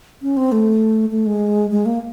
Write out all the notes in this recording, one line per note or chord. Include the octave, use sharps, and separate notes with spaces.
C#4
C4
A3
A3
G#3
G#3
A#3